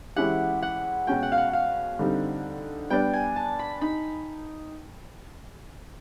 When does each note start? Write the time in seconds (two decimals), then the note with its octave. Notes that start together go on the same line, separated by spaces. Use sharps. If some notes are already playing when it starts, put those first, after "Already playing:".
0.16 E3 G#3 C#4 E4 G4 F#5
0.62 F#5
1.07 B2 G#3 C#4 F#4 G5
1.23 F#5
1.32 F5
1.38 F#5
1.53 F5
1.99 D3 G3 C4 D#4
2.90 G3 B3 D4 G5
3.13 G#5
3.36 A5
3.59 B5
3.81 D#4 B5